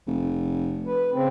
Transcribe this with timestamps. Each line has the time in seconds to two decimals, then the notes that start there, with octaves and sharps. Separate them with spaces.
0.07 F1
0.86 B4
1.13 C#3 C4